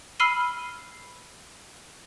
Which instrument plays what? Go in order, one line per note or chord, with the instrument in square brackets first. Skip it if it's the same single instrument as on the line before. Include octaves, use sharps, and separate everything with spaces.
[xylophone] B5 E6 F6 C7 D#7 G7